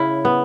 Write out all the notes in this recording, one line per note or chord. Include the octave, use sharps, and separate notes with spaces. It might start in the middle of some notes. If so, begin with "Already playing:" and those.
Already playing: C#3 E4
B3